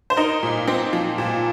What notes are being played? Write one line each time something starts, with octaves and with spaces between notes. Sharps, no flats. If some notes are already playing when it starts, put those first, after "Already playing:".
C5
D#4 A#4
A#2
C4
F3
A#2